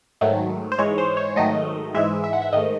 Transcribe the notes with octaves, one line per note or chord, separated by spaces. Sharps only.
G#2 D#3 F#3 A3
C5
G#2 E3 G#3 C#5
C5
C#5
G#2 D#3 F#3 A3 D#5
G#2 E3 G#3 E5
E5
F#5
E5
G#2 D#3 A3 D#5